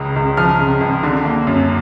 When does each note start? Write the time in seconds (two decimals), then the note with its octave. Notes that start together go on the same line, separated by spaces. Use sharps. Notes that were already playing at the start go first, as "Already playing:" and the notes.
Already playing: C#2 C#3
0.16 C#2
0.37 F3 F6
0.60 C#3
0.81 C#2
1.03 D3
1.25 A#3
1.47 F#2